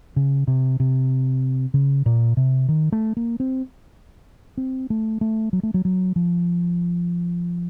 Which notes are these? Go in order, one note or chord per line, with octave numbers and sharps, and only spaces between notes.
C#3
C3
C3
C#3
A#2
C3
D#3
A3
A#3
C4
C4
A3
A3
F#3
A3
F#3
F#3
F3